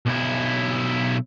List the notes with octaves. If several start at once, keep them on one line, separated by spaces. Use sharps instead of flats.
B1 E4